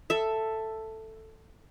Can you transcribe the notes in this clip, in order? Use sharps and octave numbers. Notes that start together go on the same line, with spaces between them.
A4 E5